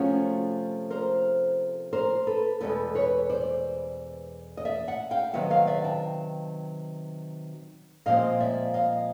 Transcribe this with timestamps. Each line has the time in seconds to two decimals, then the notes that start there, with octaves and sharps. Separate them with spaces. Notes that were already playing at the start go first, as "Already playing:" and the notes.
Already playing: C3 F3 A3 C#4 F#4 G#4
0.90 A#4 C5
1.93 A#4 C5
2.27 A4 B4
2.61 E2 B2 G#3 A4 B4
2.95 B4 C#5
3.30 C5 D5
4.57 D#5
4.65 D5 E5
4.88 E5 F#5
5.11 F5 G5
5.33 C3 D#3 F#3 B3 E5 F#5
5.50 D#5 F5
5.67 D5 E5
5.84 G5 A5
8.06 A#2 F3 G#3 C4 D#5 F5
8.40 D5 E5
8.74 D#5 F5